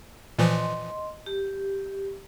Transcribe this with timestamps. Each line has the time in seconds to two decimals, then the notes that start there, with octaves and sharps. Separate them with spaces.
0.39 A#2 E3 F3 D#5 C6
1.26 G4